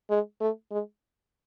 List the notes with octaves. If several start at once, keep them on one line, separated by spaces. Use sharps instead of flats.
G#3
A3
G#3